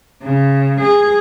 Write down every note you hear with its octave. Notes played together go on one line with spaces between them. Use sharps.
C#3
G#4